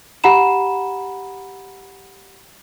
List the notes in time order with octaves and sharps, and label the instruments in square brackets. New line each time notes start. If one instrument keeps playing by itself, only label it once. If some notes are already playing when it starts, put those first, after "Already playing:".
[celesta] G4 F#5 A#5 B5 E7